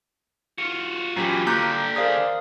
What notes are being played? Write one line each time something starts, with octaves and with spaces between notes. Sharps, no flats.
F4 F#4 C#7
A#2 E3 F#3 C#4 G4
D3 A#3 G4 A#5 D6 F#6 G6
G#4 A#4 C5 D5 F5 D#6